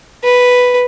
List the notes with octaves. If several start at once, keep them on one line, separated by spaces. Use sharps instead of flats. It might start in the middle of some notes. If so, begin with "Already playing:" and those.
B4